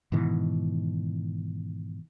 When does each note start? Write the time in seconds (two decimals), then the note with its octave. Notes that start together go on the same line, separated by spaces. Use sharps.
0.12 G#2 B2 D#3 E3